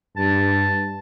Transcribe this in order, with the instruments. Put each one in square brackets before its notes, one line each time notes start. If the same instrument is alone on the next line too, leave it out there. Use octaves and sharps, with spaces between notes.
[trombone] G2 [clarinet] A5